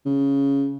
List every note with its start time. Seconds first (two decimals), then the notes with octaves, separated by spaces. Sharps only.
0.06 C#3